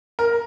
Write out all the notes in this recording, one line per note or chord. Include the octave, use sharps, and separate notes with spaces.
A#4